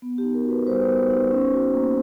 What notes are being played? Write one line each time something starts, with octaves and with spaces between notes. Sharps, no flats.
B3
G4
D#4
A#4
F#4
B4
G3 C5
B3
D#4
C#4
F#4
A#3